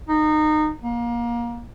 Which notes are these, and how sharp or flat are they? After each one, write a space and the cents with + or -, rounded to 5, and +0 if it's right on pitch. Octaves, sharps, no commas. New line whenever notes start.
D#4 -25
A#3 +25